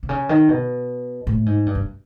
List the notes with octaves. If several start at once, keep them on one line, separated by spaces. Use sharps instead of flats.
C3
C#3
D#3
B2
A2
G#2
G2
F#2